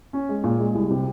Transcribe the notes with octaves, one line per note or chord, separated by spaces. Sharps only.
C#4
G#3
A#2
G#3
C2
C3